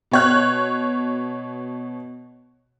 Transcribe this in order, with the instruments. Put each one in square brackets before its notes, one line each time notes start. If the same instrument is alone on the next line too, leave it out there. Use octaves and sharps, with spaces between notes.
[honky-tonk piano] B2 C#5 F#6